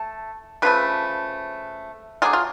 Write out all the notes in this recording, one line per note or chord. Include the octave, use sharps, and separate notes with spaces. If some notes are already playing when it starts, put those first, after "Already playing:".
Already playing: A3 A5
C#3 F3 A3 B4
F#3 A3 D4 F4 G#4
F4